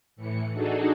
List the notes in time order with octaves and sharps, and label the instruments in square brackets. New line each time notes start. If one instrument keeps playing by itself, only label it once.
[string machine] A2 E3 C#7
D4 D#4 F#4 G#4 A4